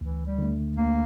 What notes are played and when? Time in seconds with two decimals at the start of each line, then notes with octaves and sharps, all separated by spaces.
0.01 D2 E3
0.26 G3
0.38 D3 A3
0.77 D2 A#3